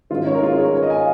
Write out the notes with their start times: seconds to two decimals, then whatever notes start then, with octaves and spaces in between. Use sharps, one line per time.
0.10 G#2 D#3 C#4 F4
0.27 C#5
0.34 A#4
0.43 F4
0.53 G#4
0.59 C#5
0.64 A#4
0.75 C#5
0.82 D#5
0.90 G#5
0.98 F5